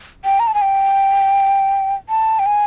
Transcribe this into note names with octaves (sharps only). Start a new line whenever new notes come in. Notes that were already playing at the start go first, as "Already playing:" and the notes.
G5
A#5
A5
G#5
G5
A5
G5
G#5